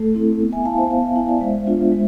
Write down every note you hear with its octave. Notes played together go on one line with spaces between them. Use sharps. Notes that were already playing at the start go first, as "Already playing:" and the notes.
Already playing: A3 A4
C4 E4
B3
E5 G#5
E4 F5 A5
C5 E5
B3 F5 A5
E5 G#5
E4 E5 G#5
D5 F5
G#3 C5 E5
B3 D4 F4
G#3